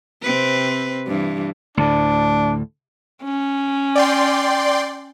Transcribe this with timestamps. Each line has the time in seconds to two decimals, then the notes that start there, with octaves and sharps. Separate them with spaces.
0.22 C3 C4 B4
1.07 G2 E3
1.77 D2 A2 D3 D4
3.24 C#4
3.95 D5 G5 C6